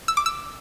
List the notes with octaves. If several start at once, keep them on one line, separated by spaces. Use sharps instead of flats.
E6
D6
E6